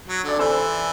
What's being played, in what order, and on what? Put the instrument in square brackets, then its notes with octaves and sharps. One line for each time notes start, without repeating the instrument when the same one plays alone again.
[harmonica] F#3
[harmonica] D3 [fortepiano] D5
[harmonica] E3 [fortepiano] A4 C5